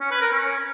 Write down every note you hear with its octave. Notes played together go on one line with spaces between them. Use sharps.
C#4
B4
A#4
C#4